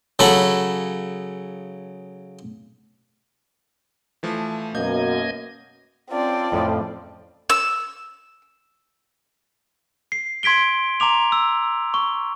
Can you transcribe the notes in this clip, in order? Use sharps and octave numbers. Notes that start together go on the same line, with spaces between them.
C#3 F#3 A4 B5
E3 F3 A3
F#2 B2 A#3 D#5 G6 G#6
C4 C#4 F4 D5 A5
F2 A2 F3
E6
C7
C6 G#6 B6 D7 G7
A#5 C6 D6 F7
E6
C#6